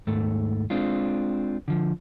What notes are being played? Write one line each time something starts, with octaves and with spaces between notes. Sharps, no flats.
D#2 G#2 A3
G#3 C4 D4 F4
D3 F3